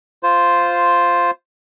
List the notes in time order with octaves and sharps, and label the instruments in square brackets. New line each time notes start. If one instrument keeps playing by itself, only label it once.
[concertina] F4 C5